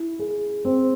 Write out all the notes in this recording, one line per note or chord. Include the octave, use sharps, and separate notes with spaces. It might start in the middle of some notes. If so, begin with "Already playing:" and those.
Already playing: E4
G#4
C4